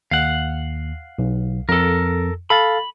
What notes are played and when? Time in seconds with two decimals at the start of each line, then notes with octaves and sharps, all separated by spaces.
0.11 D#2 F5 F#5
1.19 B1
1.69 F2 A4 A#4
2.50 A4 F5 B5 A6